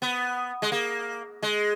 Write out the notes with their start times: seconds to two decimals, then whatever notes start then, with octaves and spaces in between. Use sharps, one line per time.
0.02 B3
0.62 G#3
0.72 A#3
1.42 G#3